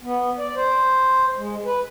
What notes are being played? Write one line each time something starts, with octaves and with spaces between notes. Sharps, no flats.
B3
D5
C5
G#3
B4